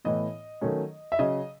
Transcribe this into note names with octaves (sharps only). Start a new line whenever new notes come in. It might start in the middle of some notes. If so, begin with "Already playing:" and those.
A2 E3 B3 D#5
D#3 F#3 A3 C#4
E5
C#3 F#3 C#4 D#5